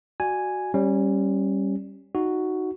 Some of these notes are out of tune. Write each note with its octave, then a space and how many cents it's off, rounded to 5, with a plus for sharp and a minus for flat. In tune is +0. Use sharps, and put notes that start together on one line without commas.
F#4 +0 D5 +25 G#5 +0
G3 +0 C#4 -20
D#4 +0 F#4 +0